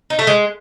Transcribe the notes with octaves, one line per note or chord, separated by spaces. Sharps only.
D#4
A3
G#3